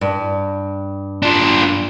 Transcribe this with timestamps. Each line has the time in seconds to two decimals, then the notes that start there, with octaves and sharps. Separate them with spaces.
0.01 G2
1.23 D4 F4